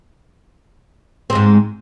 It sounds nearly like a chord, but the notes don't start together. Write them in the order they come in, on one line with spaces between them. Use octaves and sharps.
C4 G#3 G#2